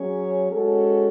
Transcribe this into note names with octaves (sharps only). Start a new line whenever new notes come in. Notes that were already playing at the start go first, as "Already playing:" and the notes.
Already playing: F#3 C#4 G#4 C#5
G#3 C#4 F#4 A4